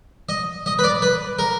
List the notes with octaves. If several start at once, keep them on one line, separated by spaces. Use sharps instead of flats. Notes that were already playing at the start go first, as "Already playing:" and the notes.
D#5
D#5
B4
D5
B4
A#4